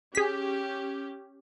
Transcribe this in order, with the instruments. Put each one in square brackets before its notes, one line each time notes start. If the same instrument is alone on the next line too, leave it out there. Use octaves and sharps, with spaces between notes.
[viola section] C#4 G4 [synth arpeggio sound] G#4 B6